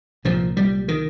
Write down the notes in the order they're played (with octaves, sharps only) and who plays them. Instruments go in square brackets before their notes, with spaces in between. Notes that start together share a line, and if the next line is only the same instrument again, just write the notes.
[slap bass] C2 A#2 F3
G3
D#3